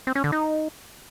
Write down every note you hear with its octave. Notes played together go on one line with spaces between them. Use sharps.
C4
C#4
D3
D#4